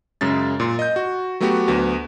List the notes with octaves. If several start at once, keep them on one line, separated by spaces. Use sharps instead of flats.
F#2 C#3 G#3 A6
A#2 C6
D#5 G6
F#4
F#3 A3 B3 F#4 G4
D2 F#3 B3